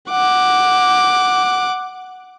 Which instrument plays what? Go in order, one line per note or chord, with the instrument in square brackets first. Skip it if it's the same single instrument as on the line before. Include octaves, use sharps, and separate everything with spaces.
[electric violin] F#5 D6